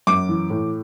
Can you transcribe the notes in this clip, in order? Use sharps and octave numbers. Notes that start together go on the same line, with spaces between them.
F#2 D6
E3
A2